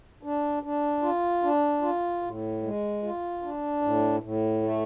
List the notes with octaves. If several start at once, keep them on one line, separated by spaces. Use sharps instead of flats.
D4
D4
F4
D4
F4
A2
G#3
F4
D4
A2
A2
A3